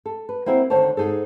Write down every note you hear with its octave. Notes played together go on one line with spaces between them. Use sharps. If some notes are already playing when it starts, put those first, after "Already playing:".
A4
B4
A#3 C4 E4 F#4 A#4
D#2 D3 C5 C#5 A5
G#2 E3 D#4 G#4 A4